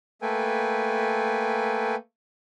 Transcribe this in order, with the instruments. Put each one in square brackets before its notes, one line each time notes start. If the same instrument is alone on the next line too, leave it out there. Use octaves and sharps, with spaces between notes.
[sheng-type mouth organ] A3 A#3 A4 B4 G5 G#5